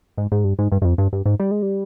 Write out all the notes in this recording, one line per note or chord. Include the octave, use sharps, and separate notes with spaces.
G#2
G#2
G2
G#2
G2
G2
F2
G2
G2
G#2
G3
G#3
G3